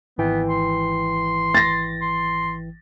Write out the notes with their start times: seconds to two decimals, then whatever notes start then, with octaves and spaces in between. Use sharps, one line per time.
0.18 G#1 E3 B3 G5
0.49 C6
1.55 A6 A#6
2.02 C6